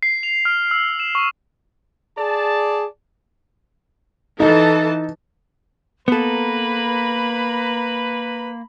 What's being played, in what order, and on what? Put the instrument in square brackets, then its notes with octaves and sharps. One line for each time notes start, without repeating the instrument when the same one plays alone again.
[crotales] C7
F7
F6
E6
E7
C#6
[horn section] G#4 D5 A5
[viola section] E3 A4 A5 [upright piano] D#4
[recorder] A#3 [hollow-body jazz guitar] B3 A4 [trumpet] B4 [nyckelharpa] A#5 B5